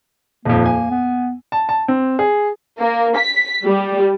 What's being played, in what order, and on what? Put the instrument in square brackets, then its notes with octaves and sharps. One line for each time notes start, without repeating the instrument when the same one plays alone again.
[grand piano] D#1 F2 [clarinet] A#3
[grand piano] G#5
[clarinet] B3
[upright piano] A5
A5
C4
G#4
[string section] A#3
B6
G3